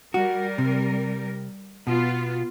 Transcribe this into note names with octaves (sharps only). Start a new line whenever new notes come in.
G3 F#4 A#4
C3
B2 B3 F4